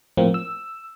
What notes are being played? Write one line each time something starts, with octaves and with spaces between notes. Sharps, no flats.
A2 F3 A#3 C4
E6